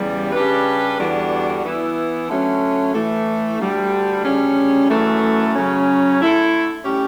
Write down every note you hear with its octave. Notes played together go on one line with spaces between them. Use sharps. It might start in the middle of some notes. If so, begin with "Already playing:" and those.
Already playing: E2 C#3 G3
C#3 G3 D4 G4 B4
E2 D3 G3 D4 F#4
E3 B3 E4
D3 F#3 A3 C#4
A2 E3 A3
D2 D3 G3
D2 C#3 G3 C#4
F#2 E3 A3
C#3 F#3 C#4
D3 A3 E4 A4
A2 G3 C#4 G4